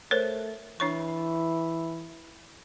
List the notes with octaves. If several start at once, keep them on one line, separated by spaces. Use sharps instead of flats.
A3 A#4 C5 C#5
E3 D4 C#5 C#6